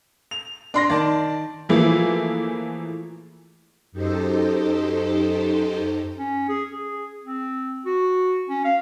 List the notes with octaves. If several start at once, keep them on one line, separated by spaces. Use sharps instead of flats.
F7
D4 C6 A#6
D#3 D5 A5
E3 F3 A3 A#3 E4 G#4
F#2 D#4 G4 A4 C5
C#4
G#4
G#4
C4
F#4
C#4
F5